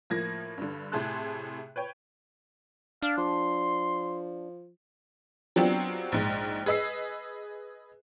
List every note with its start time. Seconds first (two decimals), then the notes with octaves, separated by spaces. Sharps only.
0.10 A2 F3 A#3 G#6 A#6
0.58 G2 D3
0.92 A2 C3 G#4 A5 C6 F#6
1.76 B4 C#5 G5
3.02 D4 F5
3.18 F3 C6
5.56 F#3 B3 C4 D4 F4 G4
6.12 A#1 G#2
6.66 G#4 B4 D#5 E6 C7